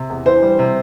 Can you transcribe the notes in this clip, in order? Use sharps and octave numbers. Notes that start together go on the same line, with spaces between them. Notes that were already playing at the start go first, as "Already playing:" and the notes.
Already playing: C3
E2
E3 C5
G3
C3